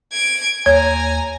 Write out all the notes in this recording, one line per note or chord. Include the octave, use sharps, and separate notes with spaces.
G#6 D7
D#2 C#5 G#5 A#5 G#6